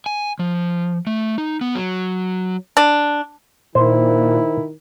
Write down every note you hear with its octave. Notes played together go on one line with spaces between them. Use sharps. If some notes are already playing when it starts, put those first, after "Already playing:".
G#5
F3
A3
D#4
B3
F#3
D4
A#2 D#3 E4 C5